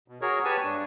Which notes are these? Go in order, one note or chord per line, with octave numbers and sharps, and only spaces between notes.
B2
F#4 G#4 A#4 C#5
G4 B4 C#5 G#5 A5 C#6
G2 D4